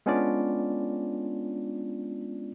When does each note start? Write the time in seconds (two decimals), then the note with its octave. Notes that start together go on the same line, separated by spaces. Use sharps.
0.06 G#3 B3 C#4 D4 F4 D5